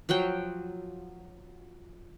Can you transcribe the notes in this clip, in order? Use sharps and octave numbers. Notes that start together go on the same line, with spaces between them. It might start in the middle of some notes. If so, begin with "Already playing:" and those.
F3 F#3 F#5 G5